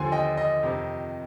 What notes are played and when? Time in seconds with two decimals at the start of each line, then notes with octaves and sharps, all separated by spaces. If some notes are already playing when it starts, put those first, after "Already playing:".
Already playing: D#2 D3 F3 G#5 C6
0.12 D#5 G5
0.37 D#5
0.63 F2 C3 D#3